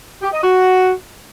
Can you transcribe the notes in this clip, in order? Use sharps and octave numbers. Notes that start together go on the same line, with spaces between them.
G4
D#5
F#4